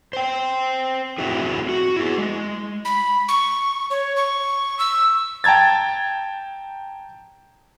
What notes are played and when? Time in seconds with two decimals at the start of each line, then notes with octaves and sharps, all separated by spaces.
0.13 C5 G5
1.18 A3 C4 E4 F#4 G#4
1.69 F#4
1.96 E4 G#4
2.18 G#3
2.85 B5
3.28 C#6
3.90 C#5
4.16 C#6
4.79 E6
5.44 G5 A5 A#5 G#6 A6